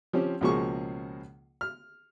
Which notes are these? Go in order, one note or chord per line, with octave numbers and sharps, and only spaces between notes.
F3 C4 C#4 G4
C#2 B2 F3 A#3 G#4 C#6
F6